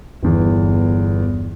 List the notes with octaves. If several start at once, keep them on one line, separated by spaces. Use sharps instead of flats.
G1 E2